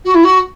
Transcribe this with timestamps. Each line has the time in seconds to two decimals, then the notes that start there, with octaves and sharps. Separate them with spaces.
0.04 F#4
0.14 E4
0.23 F#4